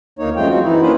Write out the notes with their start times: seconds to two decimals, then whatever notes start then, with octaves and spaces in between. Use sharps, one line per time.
0.19 D2 A#3 D#4 C#5
0.36 F#2 F3 G#3 A3 F4 G5
0.49 F#3 G#3 C4 F#4
0.63 E3 D#4 E4
0.82 A#3 C#4 D4 F4 B4 C5